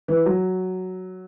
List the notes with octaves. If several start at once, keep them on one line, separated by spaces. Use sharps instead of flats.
E3
F#3